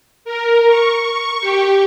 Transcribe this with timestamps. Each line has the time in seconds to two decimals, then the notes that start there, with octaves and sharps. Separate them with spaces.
0.25 A#4
0.68 C#6
1.04 C#6
1.41 G4